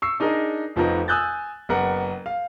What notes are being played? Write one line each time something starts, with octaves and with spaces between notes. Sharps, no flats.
C#6 E6 C7
D4 D#4 G#4 A#4 D#5
F1 F2 F3 B3 D#4 A#4
G#5 D#6 E6 F#6 G6 A6
F#1 B3 A#4 F#5
F5